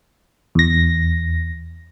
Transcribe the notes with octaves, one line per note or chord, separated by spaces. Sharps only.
E2 A#6